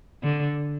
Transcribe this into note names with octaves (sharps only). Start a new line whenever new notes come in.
D3